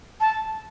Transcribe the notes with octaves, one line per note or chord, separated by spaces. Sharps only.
A5